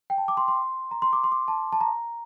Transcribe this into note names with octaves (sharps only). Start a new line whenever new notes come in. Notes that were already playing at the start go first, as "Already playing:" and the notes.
G5
A5
D6
C6
C6
A#5
C6
D6
C6
D6
A5
A5
A#5